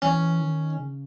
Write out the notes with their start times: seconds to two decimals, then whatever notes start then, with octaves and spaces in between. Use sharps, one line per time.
0.02 E3 C#4
0.40 D#3
0.77 C#3